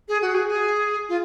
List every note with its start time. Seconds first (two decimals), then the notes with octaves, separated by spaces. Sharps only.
0.08 G#4
0.22 F#4
0.35 G#4
0.49 G#4
1.09 F4